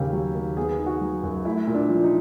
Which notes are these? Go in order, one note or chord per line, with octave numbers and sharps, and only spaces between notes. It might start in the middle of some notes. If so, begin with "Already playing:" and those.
Already playing: D#2 C#3 G4
F#3
D#2
B3 G#4
D#3
F#4
F#3
F#2
A3 E4
A#2
D4
F3
D#4